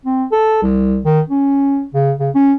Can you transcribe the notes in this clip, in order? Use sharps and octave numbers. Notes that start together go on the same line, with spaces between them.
C4
A4
C2
D#3
C#4
C#3
C#3
C#4